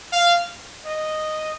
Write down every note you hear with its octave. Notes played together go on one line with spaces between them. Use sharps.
F5
D#5